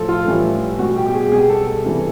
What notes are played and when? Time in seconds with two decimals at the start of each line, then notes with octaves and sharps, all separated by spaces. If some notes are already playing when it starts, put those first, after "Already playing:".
Already playing: A2 F3 A4
0.08 F4
0.26 A2 E3 G3
0.79 B2 G3 F#4
0.96 G4
1.06 G4
1.14 G#4
1.32 B2 G3 G#4
1.50 A4
1.67 A4
1.85 C3 E3 G3